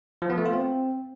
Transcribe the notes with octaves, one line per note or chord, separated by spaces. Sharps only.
F3
B3
A3
F4
C4